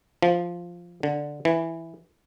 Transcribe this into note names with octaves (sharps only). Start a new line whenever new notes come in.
F3
D3
E3